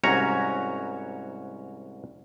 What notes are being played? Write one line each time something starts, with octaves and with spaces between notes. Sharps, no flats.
C2 G#2 C#4 F#4 C#5 A#5